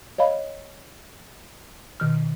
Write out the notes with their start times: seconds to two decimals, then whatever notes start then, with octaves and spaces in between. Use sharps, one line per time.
0.18 C#5 D#5 F5 B5
2.00 B2 D#3 F6